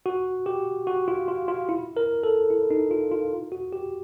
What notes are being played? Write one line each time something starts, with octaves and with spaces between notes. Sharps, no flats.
F#4
G4
F#4
F4
F4
F4
E4
A#4
A4
E4
D#4
F4
F4
F#4
G4